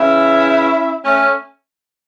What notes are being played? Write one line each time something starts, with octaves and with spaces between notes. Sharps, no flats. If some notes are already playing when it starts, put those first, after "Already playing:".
Already playing: C#3 E3 C#4 E4
A3 C#4